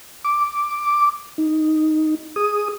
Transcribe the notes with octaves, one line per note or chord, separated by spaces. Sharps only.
D6
D#4
G#4 D#6